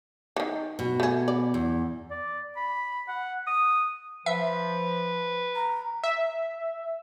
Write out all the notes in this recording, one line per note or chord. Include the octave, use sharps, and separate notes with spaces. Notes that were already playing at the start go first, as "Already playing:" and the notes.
D#3 E3
B2
A3 G#4
D5
E2
D5
B5
F#5
D#6
F3 B4 E5
A#5
E5